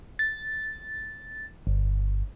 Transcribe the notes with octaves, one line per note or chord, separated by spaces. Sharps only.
A6
G1